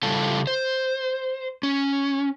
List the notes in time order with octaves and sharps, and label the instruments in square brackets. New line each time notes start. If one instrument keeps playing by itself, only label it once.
[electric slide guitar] C#3 G3 E4 F4 A4 A5
C5
C#4